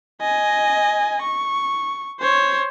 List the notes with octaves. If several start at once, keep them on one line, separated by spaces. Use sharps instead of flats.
D#5 G#5
C#6
C5 C#5